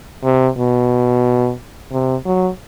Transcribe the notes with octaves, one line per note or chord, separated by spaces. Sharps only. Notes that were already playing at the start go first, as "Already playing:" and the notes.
C3
B2
C3
F#3